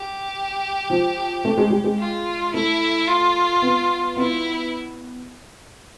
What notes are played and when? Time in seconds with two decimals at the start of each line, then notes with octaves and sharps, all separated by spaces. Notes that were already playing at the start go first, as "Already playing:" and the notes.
Already playing: G4
0.90 F3
1.45 A3
1.58 G#3
1.70 G3
1.84 G#3
1.99 F4
2.54 A3 E4
3.08 F4
3.62 B3
4.16 B3 E4